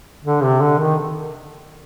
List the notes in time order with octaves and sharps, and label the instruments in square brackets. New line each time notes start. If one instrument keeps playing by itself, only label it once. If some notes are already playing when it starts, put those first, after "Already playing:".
[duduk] D3
C3
D3
D#3